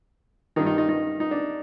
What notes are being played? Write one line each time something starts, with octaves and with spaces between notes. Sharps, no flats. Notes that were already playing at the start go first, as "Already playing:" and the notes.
G2 D#3 D#4
D#4
D#4
D#4
D#4
D4